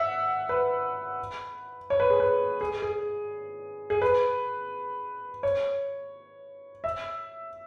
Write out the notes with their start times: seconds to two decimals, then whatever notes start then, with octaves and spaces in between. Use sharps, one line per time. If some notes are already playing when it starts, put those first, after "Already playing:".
Already playing: E5 F#5
0.49 B4
1.90 C#5
2.00 B4
2.10 G#4
2.20 B4
2.61 G#4
2.82 G#4
3.90 G#4
4.02 B4
5.43 C#5
6.84 E5